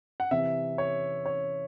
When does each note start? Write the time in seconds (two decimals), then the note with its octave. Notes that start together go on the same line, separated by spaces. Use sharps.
0.20 F#5
0.31 C3 E3 E5
0.78 C#5
1.26 C#5